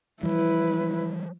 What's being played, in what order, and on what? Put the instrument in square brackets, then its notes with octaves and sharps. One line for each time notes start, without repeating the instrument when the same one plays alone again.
[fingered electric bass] E3 F3 G3 [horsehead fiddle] E4 B4